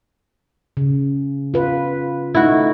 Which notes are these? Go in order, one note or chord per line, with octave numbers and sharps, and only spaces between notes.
C#3
F4 B4
A3 D#4 E4 F#4